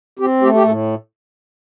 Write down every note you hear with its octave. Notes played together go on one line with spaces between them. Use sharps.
C4 G4
A3 G4
G4
A2 A4